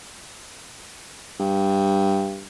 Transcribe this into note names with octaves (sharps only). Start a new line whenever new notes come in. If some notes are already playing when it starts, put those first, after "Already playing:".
G2